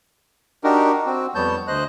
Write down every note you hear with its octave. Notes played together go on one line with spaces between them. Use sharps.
D4 D#4 F#4 G4 A#4
C4 F#4
F2 G3 B3 C#5 A5 G6
D2 C5 D#5 F#6